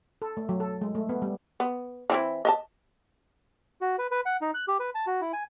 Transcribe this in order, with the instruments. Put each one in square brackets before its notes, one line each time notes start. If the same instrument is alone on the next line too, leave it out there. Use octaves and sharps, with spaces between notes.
[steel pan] A4
A3
F#3
A4
G#3
A3
B3
G3
[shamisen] B3
E3 C4 E4
D#5 E5 A5
[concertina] F#4
B4
B4
F#5
D#4
F#6
G4
B4
A5
F#4
E4
G#5